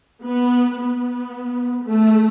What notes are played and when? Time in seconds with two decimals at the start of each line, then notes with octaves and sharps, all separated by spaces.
0.24 B3
0.77 B3
1.84 A3